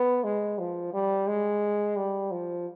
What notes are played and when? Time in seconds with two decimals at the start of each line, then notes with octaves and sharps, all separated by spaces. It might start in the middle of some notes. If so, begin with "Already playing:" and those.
Already playing: B3
0.24 G#3
0.59 F3
0.94 G3
1.27 G#3
1.96 G3
2.31 F3